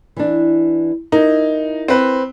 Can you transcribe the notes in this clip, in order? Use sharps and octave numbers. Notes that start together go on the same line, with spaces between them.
E3 D4
D#4 E4 A#4
C4 B4